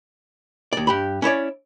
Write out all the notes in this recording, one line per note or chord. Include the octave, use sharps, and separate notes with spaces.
D#2 D5
G2 G4 B5
C#4 E4 C#5 D5